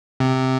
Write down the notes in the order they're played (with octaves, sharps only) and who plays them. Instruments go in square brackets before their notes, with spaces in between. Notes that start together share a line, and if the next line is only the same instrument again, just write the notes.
[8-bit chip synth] C3